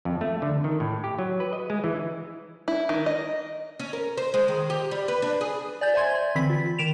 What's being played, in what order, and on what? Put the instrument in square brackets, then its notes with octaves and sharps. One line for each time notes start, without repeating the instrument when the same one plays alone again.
[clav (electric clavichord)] F2
A3
D3
D#3
A2
G4
F#3
B4
D#5
G#3
E3
[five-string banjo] E4
D#3
D#5
[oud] C#4
A#4
C5
G#3
D#3
G4
G3
B4
D4
G#4
[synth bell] D5 G#5 G6 A6
C5 E5 G#5 C6 G#6
D5
D3 E3 C4 B5 B6
F4
D#3 D7 E7 F7